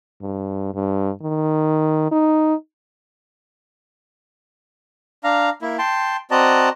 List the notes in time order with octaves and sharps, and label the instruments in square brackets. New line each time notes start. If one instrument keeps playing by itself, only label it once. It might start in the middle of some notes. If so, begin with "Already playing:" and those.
[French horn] G2
G2
D#3
D#4
[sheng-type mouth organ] D4 F5 A#5
A#3 E4
G5 A5 C6
C4 F#4 D5 D#5 A5 A#5